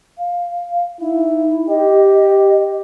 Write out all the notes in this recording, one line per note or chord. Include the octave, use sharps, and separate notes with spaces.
F5
D#4 E4
G4 D#5